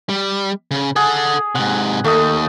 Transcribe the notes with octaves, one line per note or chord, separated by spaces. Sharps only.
G3
C#3
G#4 A4 F#5
G#2 C3 F#5
D#2 A3 D#5